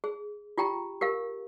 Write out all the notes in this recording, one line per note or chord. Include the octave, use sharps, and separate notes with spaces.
G#4
F4 G4 G5 A#5
G4 A#4 F5